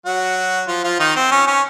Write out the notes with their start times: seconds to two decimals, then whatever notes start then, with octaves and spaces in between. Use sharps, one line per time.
0.06 F#3 F#4
0.68 F3 F4
0.84 F3 F4
0.99 D#3 D#4
1.16 C4
1.32 C#4
1.47 C#4